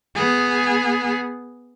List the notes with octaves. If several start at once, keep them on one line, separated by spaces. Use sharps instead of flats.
B3 G#4